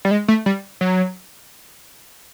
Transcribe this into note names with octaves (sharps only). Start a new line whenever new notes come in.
G3
G#3
A3
G3
F#3